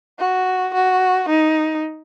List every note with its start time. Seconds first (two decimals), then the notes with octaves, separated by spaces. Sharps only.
0.19 F#4
0.74 F#4
1.29 D#4